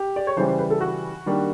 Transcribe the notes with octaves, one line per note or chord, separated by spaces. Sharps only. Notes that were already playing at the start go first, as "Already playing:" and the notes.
Already playing: G4
D5
C#5
C#3 E3 G3 C5
C5
B4
A4
F#4
D#3 G3 A#3 D4